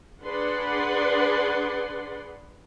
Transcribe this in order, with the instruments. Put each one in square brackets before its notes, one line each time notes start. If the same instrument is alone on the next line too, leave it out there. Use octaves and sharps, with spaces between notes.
[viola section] D4 G#4 B4 D5 F#5 C6